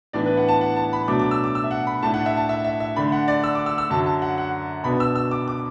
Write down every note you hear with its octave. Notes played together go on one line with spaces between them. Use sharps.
A2 E3 B3 D4 D5
B4
F#5
A5
F#5
A5
B5
B2 F#3 A3 D4 D6
D6
E6
D6
E6
E5
F#5
B5
A2 A3 D4 A5
F#5
E5
A5
E5
E5
E5
D3 A3 D4 B5
F#5
D5
E6
D6
E6
E6
F#2 D3 F#3 A5
A5
F#5
F#5
B2 B3 D4 B5
E6
E6
D6
D6